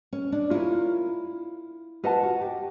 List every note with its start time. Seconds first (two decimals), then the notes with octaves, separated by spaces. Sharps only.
0.13 C#4
0.32 D4
0.50 E4 F4 A#4 C#5
2.04 F4 B4 D#5 F#5 A5
2.23 F#4
2.41 G4